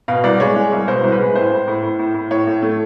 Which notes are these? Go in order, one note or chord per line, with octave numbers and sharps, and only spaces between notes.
B2 F5
C2 D5
G#3 C#5
G#3
C2
B2 C5
C2
B4
G#3
A2 C5
A2
A2
A2
A2
A2
A2 C#5
A2
A3